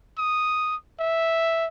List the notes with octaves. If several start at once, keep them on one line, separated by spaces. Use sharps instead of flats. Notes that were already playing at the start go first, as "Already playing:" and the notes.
D#6
E5